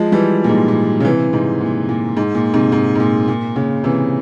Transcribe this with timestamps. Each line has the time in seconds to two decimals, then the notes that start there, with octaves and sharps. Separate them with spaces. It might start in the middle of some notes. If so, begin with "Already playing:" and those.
Already playing: F3 G#3
0.12 E3 G3
0.44 A#2
0.49 G#2
0.68 A#2
1.00 C#3
1.05 C3 E3
1.33 G#2 C3
1.61 A#2
1.89 A#2
2.17 G#2
2.35 A#2
2.54 G#2 C3
2.72 G#2
2.95 G#2
3.00 A#2
3.28 A#2
3.56 A#2 C#3
3.84 C3 E3